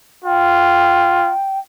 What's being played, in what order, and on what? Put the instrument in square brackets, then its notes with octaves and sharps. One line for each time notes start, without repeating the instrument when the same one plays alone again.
[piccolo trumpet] F4 [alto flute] G5